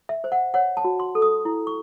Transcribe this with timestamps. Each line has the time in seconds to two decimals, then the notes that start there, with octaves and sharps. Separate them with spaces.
0.09 E5
0.24 C5
0.32 F#5
0.54 C#5 F#5
0.77 A5
0.84 F#4
1.00 C6
1.15 A4
1.22 D#6
1.45 E4
1.67 C#6